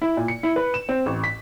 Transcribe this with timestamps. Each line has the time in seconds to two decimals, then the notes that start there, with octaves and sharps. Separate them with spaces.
0.02 E4
0.17 A#2
0.28 C#7
0.43 E4
0.56 B4
0.74 E7
0.89 C4
1.06 A1
1.24 B6